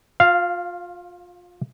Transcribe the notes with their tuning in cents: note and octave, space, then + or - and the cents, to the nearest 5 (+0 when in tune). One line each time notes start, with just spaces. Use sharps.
F4 +25 F5 -5